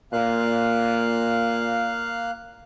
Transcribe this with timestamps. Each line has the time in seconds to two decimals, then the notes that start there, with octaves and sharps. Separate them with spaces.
0.13 A#2 A#3 F5 F#6